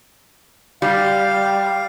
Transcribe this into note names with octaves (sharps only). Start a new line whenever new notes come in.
G3 G4 F5